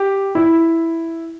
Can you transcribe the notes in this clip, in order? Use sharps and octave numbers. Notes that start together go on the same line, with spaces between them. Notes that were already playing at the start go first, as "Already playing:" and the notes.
Already playing: G4
E4